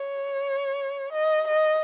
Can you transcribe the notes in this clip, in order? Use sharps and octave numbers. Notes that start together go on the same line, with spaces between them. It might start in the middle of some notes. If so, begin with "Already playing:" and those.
Already playing: C#5
D#5
D#5